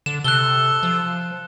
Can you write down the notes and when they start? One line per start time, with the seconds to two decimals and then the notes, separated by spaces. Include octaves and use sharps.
0.06 D3 E7
0.24 C3 A4 F#6 G7
0.83 F3